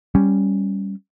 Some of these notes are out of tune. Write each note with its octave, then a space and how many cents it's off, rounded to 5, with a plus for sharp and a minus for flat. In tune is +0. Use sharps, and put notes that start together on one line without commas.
G3 +0 C#4 +0